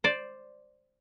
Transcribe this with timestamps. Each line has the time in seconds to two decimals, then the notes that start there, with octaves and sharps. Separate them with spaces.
0.04 C5 D5